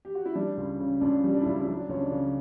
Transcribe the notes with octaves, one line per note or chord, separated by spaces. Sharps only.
G4
F#4
E4
G3 D4
C#2
C#3
C#2 D4
G3
D4
E4
C#2 D4
E4
F#3 D4
C#2 C#4
D4
C#3